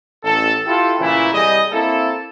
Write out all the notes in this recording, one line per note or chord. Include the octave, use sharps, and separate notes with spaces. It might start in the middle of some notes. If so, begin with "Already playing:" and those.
A1 A4
E4 F4 G4 A4
A#2 C#3 E3 A3 E4
C2 G3 G#4 D#5
A#3 C4 E4 A4